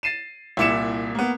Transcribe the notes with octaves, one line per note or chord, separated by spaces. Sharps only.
A6 C7 D#7 E7
C2 A#2 E4 D6 C#7 E7
A#3 B3